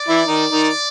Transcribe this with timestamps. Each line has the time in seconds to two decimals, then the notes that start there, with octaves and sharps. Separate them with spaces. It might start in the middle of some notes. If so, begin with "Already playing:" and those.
Already playing: D5
0.09 E3 E4
0.27 D#3 D#4
0.52 D#3 D#4